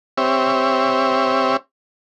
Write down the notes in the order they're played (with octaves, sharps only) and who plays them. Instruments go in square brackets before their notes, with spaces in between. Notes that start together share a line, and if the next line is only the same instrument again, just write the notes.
[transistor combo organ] C4 G4 C#5 E5